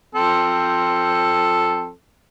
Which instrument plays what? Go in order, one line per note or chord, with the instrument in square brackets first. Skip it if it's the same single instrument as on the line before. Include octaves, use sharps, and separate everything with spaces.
[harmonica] F3 C4 A4